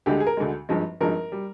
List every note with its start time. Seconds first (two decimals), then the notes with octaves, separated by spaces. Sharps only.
0.06 D2 D3 G#3 G4
0.20 G#4
0.27 A#4
0.37 D2 D3 G#3
0.69 G#1 G2 F3 G#3
1.01 G#1 G2 F3 G#3 A#4
1.32 G3